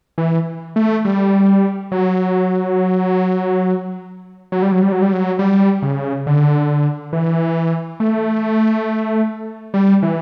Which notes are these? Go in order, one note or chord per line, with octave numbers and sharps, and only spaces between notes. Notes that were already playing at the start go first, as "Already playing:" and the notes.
E3
A3
G3
F#3
F#3
G3
F#3
G3
F#3
G3
F#3
G3
C#3
D3
E3
A3
G3
E3